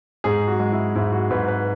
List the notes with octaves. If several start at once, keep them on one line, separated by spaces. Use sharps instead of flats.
G#2 G#4
F#4
G#3
E4
G#2 E4
F#4
G#2 B4
B4